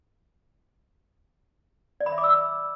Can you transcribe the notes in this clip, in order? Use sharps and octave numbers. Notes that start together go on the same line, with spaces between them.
D5
B5
E5
D6
E6